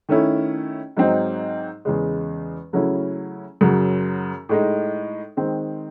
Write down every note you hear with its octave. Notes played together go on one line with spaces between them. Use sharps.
D#3 A3 C#4 E4
G#2 F#3 C4 D#4
E2 C#3 G#3
C#3 F#3 A3 C#4 E4
F#2 C#3 F#3
A2 G#3 D#4
D#3 G#3 C4